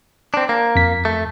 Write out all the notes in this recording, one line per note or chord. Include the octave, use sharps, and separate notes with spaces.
C4 D4
A#3
F2 B6
A3